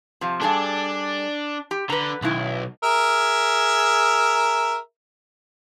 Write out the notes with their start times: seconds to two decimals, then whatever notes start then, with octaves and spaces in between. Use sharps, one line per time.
0.21 C3 F3
0.41 G2 D4 G#4 A4
1.71 G4
1.90 D3 B4 A#5
2.22 B1 F#2 D#3 E4
2.83 G#4 A#4 E5